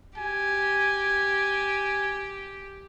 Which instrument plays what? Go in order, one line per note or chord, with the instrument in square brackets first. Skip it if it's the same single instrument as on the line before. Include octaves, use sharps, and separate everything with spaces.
[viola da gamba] G4 [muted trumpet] G#5